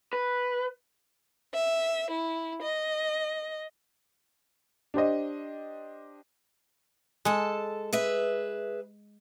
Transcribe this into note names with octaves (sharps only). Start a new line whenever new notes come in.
B4
E5
E4
D#5
D4 G4 C5 D#5
G#3 A4 A5
G#4 B4 E5